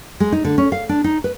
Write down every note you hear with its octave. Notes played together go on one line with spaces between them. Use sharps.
G#3
D#4
D3
C#4
F5
D4
D#4
B4